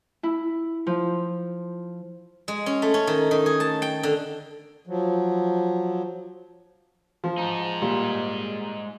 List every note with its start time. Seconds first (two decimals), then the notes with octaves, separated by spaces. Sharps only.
0.23 E4
0.87 F3
2.48 G#3
2.66 C#4
2.82 A3
2.94 C#4
3.07 D#3
3.31 D#3
3.46 G#4
3.60 A5
3.82 G5
4.03 D3
4.87 F3 F#3
7.24 F3
7.38 G#3 D#4
7.82 A#2 G3